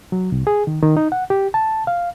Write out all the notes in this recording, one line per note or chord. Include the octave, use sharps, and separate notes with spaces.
F#3
C2
G#4
D#3
D#3
D#4
F#5
G4
A5
F5